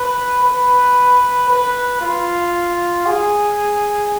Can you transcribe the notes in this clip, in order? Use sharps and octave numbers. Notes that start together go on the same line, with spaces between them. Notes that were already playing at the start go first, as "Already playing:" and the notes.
Already playing: B4
B4
B4
F4
G#4